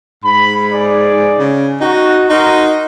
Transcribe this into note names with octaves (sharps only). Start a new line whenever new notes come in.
G#2 B5
G#4 D5
C#3
D#4 F#4
D#4 F#4 A#4 C6